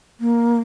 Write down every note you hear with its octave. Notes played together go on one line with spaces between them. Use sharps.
A#3